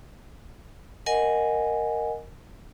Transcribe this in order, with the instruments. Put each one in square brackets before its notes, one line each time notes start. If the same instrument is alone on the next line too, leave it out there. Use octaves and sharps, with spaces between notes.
[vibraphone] A#4 D#5 F#5 G#5